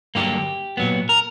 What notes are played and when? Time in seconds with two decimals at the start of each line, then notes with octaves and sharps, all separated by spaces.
0.15 G2 D3 F#3 A#3 G4
0.77 A#2 F#3 B3
1.09 A#4